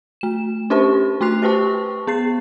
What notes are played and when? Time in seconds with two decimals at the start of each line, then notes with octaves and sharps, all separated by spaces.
0.21 A3 E7
0.70 C#4 D4 G4 C5 A5 C#6
1.21 A3 C6 D6 F#6 C7 F7
1.42 G4 B4 C5 G5 A5 C#6
2.07 B3 G#4 A6 C7